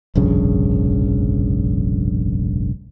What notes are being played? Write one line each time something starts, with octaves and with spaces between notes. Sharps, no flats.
F1 A#1 G2 C#3